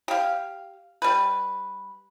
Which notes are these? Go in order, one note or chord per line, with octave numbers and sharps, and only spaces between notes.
G4 F5
G3 B4